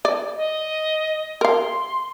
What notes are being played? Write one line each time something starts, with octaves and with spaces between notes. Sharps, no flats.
D5
D#5
A#4 F5 C6